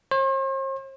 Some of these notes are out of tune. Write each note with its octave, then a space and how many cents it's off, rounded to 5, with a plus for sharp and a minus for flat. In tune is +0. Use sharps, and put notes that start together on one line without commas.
C5 +45